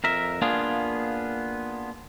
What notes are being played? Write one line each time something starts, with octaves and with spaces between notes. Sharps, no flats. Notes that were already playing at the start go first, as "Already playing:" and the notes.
F2 A#4 E5
A#3 B3 D4 F4 G#4